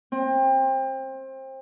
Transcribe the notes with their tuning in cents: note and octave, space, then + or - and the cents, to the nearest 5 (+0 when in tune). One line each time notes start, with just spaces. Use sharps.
C4 +25